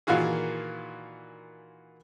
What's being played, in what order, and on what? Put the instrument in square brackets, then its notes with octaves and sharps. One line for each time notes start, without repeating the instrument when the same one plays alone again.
[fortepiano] A#2 D#3 E3 F4 F#4 G#4